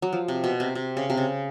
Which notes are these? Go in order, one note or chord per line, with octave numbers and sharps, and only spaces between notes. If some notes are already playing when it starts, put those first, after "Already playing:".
F#3
F3
C3
B2
C3
C3
C#3
C3
C#3